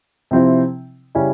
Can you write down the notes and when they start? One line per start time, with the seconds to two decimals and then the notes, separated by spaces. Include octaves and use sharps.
0.31 C3 F3 C4 E4
1.15 C#3 G3 C#4 E4